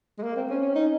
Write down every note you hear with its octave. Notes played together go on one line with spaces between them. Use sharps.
G#3
A#3
C4
C#4
C#4
D#4